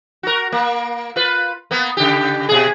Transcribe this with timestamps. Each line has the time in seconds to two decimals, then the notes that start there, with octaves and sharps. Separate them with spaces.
0.23 F#4 A#4
0.52 A#3
1.16 F4 B4
1.71 A#3 B3
1.97 C#3 G4
2.49 B2 G#4